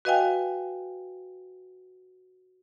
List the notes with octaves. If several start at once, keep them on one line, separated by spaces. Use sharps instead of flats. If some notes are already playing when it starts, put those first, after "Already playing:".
F#4 B4 D#5 F5 G5 G#5